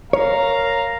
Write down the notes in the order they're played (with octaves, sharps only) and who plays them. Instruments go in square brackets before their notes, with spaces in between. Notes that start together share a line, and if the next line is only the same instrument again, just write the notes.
[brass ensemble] A#4 F5 A#5 [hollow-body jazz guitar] C#5